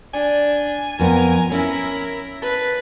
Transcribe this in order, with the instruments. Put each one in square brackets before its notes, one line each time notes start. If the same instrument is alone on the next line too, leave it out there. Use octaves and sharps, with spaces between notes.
[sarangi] D4 [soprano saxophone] G#5
[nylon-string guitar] F2 B3 [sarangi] A#4
[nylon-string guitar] C#4 [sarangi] E4 [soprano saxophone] A#4
[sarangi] B4 [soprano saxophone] A5